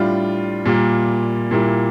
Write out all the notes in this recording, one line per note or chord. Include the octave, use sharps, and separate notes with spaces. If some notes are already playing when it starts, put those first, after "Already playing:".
Already playing: A2 G3 D4 F4
A#2 G3 A#3 F4
A#2 G3 A#3 E4